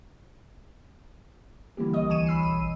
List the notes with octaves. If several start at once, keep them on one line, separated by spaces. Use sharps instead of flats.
D3 E3 G3 A#3 G4
C2 E3 C#5 D#5 D#6
D2 E3 G#5 C#6 D#7 E7
B5 E6 C7
B1 D#7
G#1